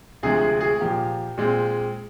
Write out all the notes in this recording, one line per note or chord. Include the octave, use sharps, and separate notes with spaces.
D2 C3 F3 G#3 G#4
G#4
G#4
A#2 F3 A#3 G4
A#2 G#3 C4